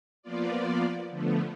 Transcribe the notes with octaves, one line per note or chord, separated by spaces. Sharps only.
F3 A#3 B3 F4 D5
D3 F3 A3 B3